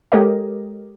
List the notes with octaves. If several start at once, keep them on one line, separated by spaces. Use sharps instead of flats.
G#3 G4 A4 A#4 C#5 D#5